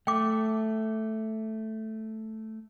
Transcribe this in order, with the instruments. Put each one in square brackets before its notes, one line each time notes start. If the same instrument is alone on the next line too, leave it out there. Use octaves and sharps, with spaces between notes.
[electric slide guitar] A3 [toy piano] G5 D6